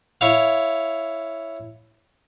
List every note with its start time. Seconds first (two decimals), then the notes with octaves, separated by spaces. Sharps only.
0.21 E4 C#5 F5